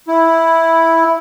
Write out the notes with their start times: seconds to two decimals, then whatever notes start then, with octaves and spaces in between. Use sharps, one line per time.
0.08 E4